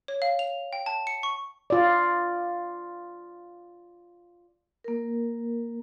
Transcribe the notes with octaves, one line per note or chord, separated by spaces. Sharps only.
C#5
F5
F7
G5
A5
C#7
C#6
F4 D5
A#3 A#4